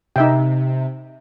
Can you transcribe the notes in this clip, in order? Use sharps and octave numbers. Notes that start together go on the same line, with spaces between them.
C3 D#4 E5 G5